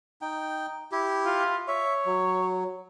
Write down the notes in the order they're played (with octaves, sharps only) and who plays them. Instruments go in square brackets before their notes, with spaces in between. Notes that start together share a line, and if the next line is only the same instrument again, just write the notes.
[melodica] D#4 G5
E4 G4
[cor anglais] F4
[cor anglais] C#5 [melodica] E5
[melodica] F#3